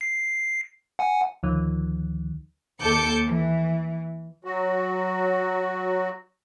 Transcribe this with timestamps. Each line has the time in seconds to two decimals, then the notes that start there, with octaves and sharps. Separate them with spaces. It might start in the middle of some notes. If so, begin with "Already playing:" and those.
0.01 C7
0.99 F#5 G#5
1.43 D2 D#3 F3
2.81 D#2 A4 D6 G6 C#7
3.27 E3
4.44 F#3 F#4